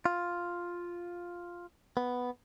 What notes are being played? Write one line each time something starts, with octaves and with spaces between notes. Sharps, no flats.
F4
B3